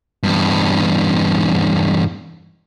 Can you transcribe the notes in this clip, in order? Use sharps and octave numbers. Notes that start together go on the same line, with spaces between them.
E2 G2